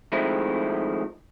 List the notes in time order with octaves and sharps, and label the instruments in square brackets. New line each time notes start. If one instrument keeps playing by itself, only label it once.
[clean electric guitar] D#3 F3 G#3 A3 C4 E4